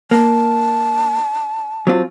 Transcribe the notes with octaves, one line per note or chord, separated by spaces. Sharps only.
A#3 A5
F#3 C4 F4